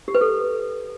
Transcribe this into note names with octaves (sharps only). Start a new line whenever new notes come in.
G4
B4
A4